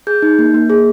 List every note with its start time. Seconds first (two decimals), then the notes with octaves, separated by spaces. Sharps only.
0.07 G#4 G6
0.22 D#4
0.39 A#3
0.54 A#3
0.70 G#4